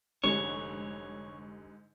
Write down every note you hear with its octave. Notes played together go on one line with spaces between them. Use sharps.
F1 G#2 D3 G3 G#3 C#4 C#5